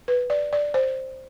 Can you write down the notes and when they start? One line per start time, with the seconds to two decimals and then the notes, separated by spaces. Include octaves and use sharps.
0.08 B4
0.30 D5
0.53 D5
0.74 C5